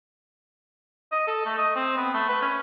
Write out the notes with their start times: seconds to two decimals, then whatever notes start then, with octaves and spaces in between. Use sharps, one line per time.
1.12 D#5
1.27 A4
1.46 A3
1.58 D#5
1.76 C4
1.97 B3
2.14 A3
2.29 B4
2.42 C#4